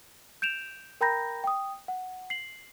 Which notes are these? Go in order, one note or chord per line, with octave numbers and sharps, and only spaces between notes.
G6 D7 E7 F7
A#4 G5 A#5 B5 G6 A#6
G5 D#6
F#5
C7 F#7